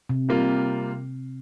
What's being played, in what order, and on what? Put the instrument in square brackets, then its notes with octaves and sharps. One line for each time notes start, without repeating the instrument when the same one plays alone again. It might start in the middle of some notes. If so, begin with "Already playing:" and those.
[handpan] C3
[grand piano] C3 G3 A#3 F4